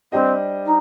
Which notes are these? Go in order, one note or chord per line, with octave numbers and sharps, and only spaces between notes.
G3 C4 D4 G4 C5 D#5
D#4